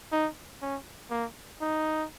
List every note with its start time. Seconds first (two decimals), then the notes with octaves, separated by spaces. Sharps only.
0.12 D#4
0.62 C#4
1.10 A#3
1.61 D#4